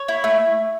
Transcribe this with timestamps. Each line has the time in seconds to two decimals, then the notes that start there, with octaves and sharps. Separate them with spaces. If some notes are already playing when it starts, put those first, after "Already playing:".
Already playing: C#5
0.08 E4
0.24 A3